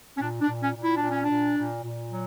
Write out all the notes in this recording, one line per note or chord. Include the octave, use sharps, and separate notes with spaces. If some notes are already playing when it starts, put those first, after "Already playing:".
C#4
A#2 D4
D4
A#2
C#4
A#2
E4
D4
A#2
C#4
D4
A#2
A#2
A#2
F#3